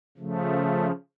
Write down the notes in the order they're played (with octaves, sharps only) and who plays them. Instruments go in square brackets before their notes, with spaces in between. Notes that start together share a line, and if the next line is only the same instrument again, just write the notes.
[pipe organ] C#3 F3 A3